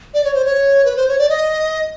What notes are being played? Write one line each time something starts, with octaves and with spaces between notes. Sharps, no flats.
D5
C#5
C5
C#5
B4
C5
C#5
D5
D#5